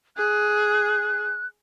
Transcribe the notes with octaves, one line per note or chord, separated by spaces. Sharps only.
G#4 F#6